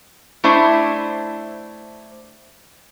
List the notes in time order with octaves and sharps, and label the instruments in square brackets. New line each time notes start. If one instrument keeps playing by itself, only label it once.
[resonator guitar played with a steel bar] A3 D4 E4 C5